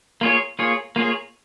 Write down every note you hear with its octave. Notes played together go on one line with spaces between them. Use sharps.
A#3 F4 G#4 C#5
A#3 F4 G#4 C#5
A#3 F4 G#4 C#5